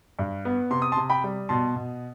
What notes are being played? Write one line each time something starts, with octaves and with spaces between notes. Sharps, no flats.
G2
B3
C3 C6
D#6
A5 C6
C3
G5 B5
G3
B2 A5 C6
B2